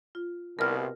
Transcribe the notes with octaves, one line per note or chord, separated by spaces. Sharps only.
F4
C2 B2 A#4 F6